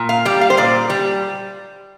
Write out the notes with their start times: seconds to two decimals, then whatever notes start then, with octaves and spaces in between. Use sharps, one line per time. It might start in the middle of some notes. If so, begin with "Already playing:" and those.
Already playing: A#2
0.09 F5
0.25 G3 D5
0.41 F5
0.50 C5
0.57 A#2 D5
0.90 G3